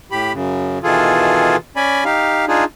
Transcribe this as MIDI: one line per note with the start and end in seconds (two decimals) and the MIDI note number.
0.11 0.32 45
0.11 0.32 67
0.11 0.32 83
0.33 0.79 42
0.33 0.79 49
0.84 1.56 47
0.84 1.56 51
0.84 1.56 52
0.84 1.56 65
0.84 1.56 68
0.84 1.56 69
1.76 2.04 61
1.76 2.04 74
1.76 2.04 80
1.76 2.04 83
2.05 2.45 63
2.05 2.45 67
2.05 2.45 77
2.48 2.64 62
2.48 2.64 63
2.48 2.64 65
2.48 2.64 68